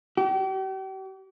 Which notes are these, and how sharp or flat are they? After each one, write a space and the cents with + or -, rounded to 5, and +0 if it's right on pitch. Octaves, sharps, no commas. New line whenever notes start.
G4 -40